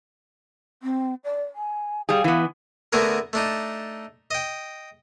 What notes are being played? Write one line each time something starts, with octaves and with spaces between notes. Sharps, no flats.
C4
D5
G#5
G3 G#4 F5
E3 B3
D3 A3 B3 F#4 G#4 A#4
A3 D4 D#4
D#5 G5